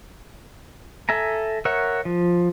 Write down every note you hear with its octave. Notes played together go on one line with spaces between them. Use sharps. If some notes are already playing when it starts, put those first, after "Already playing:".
A4 E5 G#5 A#5
A#4 C#5 E5 F#5
F3